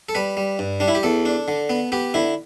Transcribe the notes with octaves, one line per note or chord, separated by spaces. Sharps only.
A4
G3 B4
G3
G2
G3 D4
E4
G4
E2 A4
D4
D3
B3
B3 G4
D3 E4